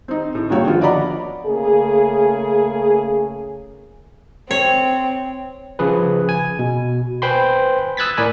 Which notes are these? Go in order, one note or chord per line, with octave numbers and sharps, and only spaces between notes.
C4 D#4
A2
G2 C#3 A#3 F#4 C#5 G5
D3 F3 B3 F4 F#4
D5 D#5 F#5 A#5 B5 D6
C#3 A3 A#3 G#4
C4 C#5
C#3 F3 G#4 B4
G#5
B2
B4 C5 G5 G#5 B5 C6
D#6 E6 F#6 G#6 A6 B6
A2 A#4 D5 G#5 B5 B6